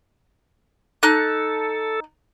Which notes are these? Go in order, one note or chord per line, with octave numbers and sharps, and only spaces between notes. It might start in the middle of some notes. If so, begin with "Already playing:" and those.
D#4 A4 F#6